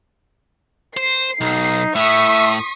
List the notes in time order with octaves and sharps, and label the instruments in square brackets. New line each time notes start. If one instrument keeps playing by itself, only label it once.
[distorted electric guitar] C5 [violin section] C7
[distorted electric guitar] B1 [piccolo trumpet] D#4
[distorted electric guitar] A2 [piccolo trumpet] E5 [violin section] C#6 D#6 B6